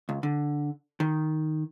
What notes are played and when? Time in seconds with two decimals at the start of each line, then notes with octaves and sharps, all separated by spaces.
0.09 C#2
0.23 D3
1.00 D#3